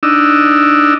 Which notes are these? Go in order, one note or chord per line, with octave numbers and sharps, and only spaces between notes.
D4 D#4 E6